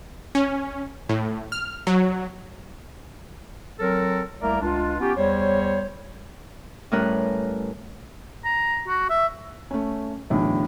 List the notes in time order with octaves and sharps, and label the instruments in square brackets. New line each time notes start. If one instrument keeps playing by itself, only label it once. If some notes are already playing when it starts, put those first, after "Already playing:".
[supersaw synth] C#4
A2
F6
F#3
[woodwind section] F#3 C4 A4 A#4
C2 A3 A#3 A#4 D5 A#5
C#2 D4 F4
B3 C#4 D#4 F4 G4
E2 G3 C5 C#5
[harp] A2 G3 C#4 A#4 B4 F#6
[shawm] A#5
F#4
E5
[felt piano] A3 C#4
B1 E2 A2 D3